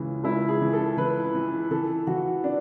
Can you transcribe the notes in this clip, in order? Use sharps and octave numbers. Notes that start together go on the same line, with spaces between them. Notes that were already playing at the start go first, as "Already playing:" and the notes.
Already playing: C#2 C#3 E3
C#2 E4
G#4
E3
A4
E3 B4
E3
E3 A4
E3 F#4
D4